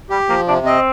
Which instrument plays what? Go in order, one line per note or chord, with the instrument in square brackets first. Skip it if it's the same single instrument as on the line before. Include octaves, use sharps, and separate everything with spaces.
[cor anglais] G3 [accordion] G4
[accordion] F3 [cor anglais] A#3
[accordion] C3 [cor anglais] D4
[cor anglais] C4 [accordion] D#5